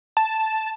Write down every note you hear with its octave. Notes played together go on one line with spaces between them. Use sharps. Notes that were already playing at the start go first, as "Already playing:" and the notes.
A5